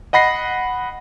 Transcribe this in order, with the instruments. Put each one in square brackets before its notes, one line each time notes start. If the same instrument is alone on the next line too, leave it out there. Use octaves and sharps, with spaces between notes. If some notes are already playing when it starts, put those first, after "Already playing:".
[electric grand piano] D#5 F#5 B5 A#6 C7